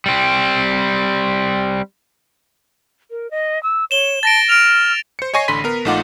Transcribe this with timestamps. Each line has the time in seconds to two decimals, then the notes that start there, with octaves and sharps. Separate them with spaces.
0.06 G3 C4
3.11 A#4
3.31 D#5
3.63 E6
3.91 C#5 E7 G7
4.23 A5 A6 A#6 D7
4.49 F6 D7 F7
5.19 C5 C#7
5.34 C#5 D#5 G#5 C#6 A#6 C7
5.48 A1 D3 B5 C6 B6 D#7
5.64 B3 A#4
5.85 A#1 A3 D#4 F4 F#5 D6